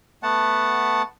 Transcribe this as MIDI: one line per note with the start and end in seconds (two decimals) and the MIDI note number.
0.23 1.02 57
0.23 1.02 59
0.23 1.02 78
0.23 1.02 81